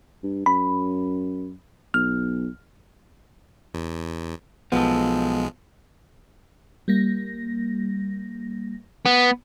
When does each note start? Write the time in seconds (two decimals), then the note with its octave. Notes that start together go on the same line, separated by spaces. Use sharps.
0.23 G2
0.46 F#2 B5
1.94 B1 F6
3.74 E2
4.72 B1 F3 G#3 B3 A4
6.88 G3 A#3 A#6
9.06 B3